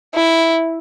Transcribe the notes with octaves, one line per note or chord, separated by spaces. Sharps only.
E4